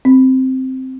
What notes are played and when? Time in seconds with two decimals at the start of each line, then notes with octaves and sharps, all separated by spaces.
0.05 C4